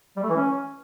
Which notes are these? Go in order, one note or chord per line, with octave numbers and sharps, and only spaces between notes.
G3
A3
E3
C#4